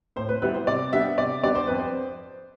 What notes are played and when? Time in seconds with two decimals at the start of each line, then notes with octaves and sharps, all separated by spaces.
0.16 A2 C5
0.29 B4
0.42 G3 B3 E4 B4
0.54 C5
0.67 C3 D5
0.93 G3 B3 D4 E5
1.18 C3 D5
1.43 G3 B3 D4 D5
1.55 C5
1.67 F2 B4
1.79 C5